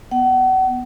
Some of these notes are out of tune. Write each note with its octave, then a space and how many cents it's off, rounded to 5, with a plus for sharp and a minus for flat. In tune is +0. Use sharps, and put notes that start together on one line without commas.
B3 +0 F#5 +35